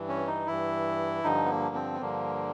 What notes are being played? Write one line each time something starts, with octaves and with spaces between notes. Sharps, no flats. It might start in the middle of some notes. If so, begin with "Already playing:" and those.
Already playing: G2 E3
C#4
D#4
G2 E3 E4
G2 D3 F3 D#4
B3
A#3
C4
B3
G2 D3 F3 A#3